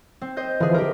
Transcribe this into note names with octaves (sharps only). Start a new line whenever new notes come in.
C4
C5 D#5 G6
D3 E3 F3 G#4
G4 A#4